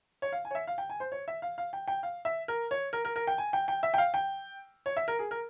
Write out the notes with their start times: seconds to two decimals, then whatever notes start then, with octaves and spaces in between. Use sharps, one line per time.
0.22 C#5
0.32 F5
0.45 G#5
0.51 C#5
0.55 E5
0.67 F5
0.78 G5
0.90 G#5
1.00 C5
1.12 C#5
1.28 E5
1.42 F5
1.58 F5
1.73 G5
1.88 G5
2.03 F5
2.25 E5
2.48 A#4
2.71 C#5
2.93 A#4
3.05 A#4
3.16 A#4
3.27 G5
3.38 G#5
3.53 G5
3.68 G5
3.83 E5
3.94 G5
3.98 F5
4.14 G5
4.86 C#5
4.97 E5
5.08 A#4
5.19 G#4
5.31 A#4